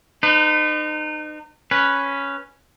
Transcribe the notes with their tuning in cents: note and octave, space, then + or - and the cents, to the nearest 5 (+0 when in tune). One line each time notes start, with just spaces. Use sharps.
D#4 -30 B4 +40
C#4 +0 B4 +0